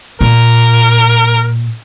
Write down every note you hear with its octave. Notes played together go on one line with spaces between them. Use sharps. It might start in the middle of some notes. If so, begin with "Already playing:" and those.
A#2 A#4